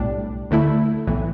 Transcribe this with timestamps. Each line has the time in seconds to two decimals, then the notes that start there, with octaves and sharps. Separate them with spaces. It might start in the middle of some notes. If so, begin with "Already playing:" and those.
Already playing: B1 A2 G3 D4
0.51 D2 D3 A3 E4
1.07 B1 A2 E3